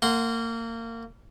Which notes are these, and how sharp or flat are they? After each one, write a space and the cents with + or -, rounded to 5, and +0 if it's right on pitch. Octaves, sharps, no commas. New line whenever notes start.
A#3 -25 F#5 +0 C6 +0